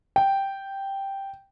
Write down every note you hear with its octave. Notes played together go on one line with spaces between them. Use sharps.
G5